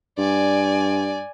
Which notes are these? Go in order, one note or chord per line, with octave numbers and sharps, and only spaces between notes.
G2 D5 G#5